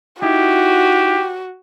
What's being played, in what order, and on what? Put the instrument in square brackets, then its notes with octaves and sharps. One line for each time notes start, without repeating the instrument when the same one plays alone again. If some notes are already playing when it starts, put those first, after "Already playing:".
[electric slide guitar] D#4 E4 [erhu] F#4 [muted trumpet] G4